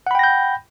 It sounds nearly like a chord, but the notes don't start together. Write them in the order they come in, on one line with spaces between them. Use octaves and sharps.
F#5 B5 G5 A#6 G6